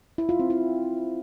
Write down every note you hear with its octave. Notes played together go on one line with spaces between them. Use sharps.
E4
F4
C4
E4